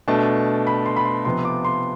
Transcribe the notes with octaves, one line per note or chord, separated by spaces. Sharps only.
B2 A3 D4 A5
B5
C6
B5
C6
C3 F3 B3 C6
D6
C6